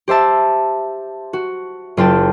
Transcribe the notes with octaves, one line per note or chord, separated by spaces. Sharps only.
G4 C5 E5 A5
F#4
F#1 F4 G5 A5